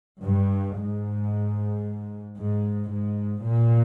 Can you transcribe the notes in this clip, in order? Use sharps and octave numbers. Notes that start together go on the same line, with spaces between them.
G2
G#2
G#2
G#2
A#2